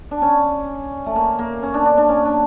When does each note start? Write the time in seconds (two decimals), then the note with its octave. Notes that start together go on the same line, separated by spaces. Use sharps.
0.11 D4
0.22 C#4
1.06 A3
1.16 A#3
1.39 A#3
1.63 C#4
1.74 D4
1.85 D4
1.98 D4
2.09 C#4
2.25 D4